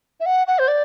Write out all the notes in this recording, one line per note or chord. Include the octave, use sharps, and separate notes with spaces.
E5
F#5
F#5
C5
D5